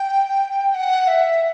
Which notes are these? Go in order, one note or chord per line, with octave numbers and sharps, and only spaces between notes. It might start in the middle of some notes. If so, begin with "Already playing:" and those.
Already playing: G5
F#5
E5